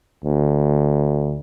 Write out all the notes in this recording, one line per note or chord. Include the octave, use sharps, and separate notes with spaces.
D2